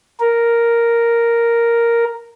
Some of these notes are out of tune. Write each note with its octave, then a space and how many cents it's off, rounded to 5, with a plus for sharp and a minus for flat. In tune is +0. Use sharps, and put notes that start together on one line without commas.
A#4 +0